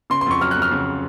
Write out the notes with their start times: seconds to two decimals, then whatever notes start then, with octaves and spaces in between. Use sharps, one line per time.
0.10 C#3 C6
0.21 C6
0.26 F2 C#6
0.41 F#3 F6
0.51 F#6
0.56 F2
0.62 F6
0.71 C#3